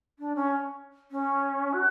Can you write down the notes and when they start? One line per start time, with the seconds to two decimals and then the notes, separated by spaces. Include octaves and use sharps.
0.19 D4
0.35 C#4
1.11 C#4
1.73 F#4